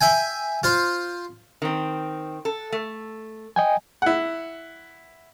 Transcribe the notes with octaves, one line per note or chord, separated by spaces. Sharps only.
E5 G5 G#5
F4 C5
D#3 C4
A4
A3
D#5 G5 G#5
E4 F#5